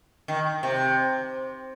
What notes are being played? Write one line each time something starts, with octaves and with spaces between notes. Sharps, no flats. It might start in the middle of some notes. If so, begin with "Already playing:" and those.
D#3
C3